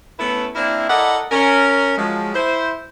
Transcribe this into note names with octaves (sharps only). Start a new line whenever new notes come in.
A3 B3 C#4 E4 A4 B4
A#3 C4 D4 E4
E4 A4 A#4 D5 D#5 F#5
C#4 A#4
F3 F#3 G#3
E4 C5